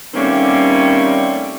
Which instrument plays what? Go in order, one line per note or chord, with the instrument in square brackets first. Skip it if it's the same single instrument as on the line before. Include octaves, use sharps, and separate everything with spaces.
[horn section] D#3 G3 A3 A#3 C4 C#4